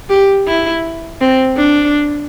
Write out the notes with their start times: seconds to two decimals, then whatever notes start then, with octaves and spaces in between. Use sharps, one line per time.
0.10 G4
0.48 E4
1.21 C4
1.57 D4